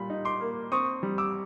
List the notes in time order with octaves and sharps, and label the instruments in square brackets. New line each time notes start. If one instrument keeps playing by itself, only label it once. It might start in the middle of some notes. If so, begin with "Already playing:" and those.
Already playing: [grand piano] A#2 G3 B5
D#4
C6 D6
A#3
C4 C#6 D#6
G3
D6 E6